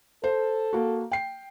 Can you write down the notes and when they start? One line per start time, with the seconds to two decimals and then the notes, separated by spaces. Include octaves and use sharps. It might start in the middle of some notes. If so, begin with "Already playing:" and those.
0.24 A4 C5
0.73 A#3 F#4
1.12 G5 C7